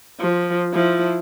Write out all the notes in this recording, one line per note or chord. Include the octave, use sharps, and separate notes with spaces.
F3
F3 E4